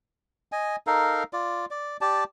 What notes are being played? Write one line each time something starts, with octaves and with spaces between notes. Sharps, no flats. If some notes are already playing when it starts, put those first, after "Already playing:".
D#5 G#5
D#4 A4 A#4 F5
F4 D5
D5
G4 D5 A5